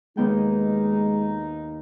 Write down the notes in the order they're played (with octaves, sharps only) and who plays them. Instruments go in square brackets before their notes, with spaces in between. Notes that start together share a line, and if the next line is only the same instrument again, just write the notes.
[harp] D#2 B3 G5 [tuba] G#3 [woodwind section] D#4